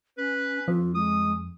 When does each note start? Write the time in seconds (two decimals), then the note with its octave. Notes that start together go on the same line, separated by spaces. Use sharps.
0.18 C#4 B4
0.68 F2 F3 F4
0.95 G#3 D#6